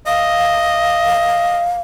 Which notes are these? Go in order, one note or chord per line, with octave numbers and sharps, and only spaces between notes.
D#5 F5